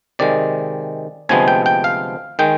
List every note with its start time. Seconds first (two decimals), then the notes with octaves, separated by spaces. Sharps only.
0.19 C3 D#3 G#3 D5
1.29 D2 C3 F3 G#3 B3 G#5
1.48 G5
1.66 G5
1.84 F5
2.39 D#3 G#3 G5